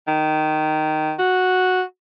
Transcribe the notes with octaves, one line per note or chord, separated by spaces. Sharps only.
D#3
F#4